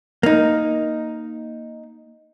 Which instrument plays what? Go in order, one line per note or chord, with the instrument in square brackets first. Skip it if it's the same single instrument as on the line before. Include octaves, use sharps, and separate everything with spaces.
[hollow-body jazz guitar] A#3 D#4